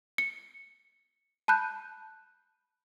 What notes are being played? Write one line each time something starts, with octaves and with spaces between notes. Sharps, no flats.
C#7
A5 B5 F#6 G6